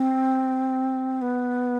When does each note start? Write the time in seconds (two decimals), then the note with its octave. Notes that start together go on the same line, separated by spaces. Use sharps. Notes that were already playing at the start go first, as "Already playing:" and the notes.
Already playing: C4
1.22 B3